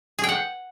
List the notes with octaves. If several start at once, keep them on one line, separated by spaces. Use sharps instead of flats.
G#4
G5
F#5